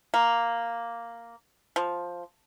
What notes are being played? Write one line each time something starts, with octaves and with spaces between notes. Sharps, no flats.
A#3
F3